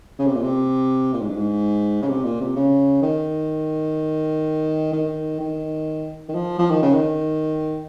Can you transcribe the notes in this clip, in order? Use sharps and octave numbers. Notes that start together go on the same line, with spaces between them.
C#3
C3
A#2
C3
A#2
G#2
G2
G#2
C#3
C3
A#2
C3
C#3
D#3
D#3
D#3
D#3
F3
F3
D#3
C#3
D#3